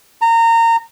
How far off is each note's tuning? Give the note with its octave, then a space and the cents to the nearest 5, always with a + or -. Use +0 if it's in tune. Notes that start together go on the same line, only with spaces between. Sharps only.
A#5 -25